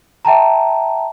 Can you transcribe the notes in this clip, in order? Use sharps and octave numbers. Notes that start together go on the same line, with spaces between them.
E5 G5 A5 A#5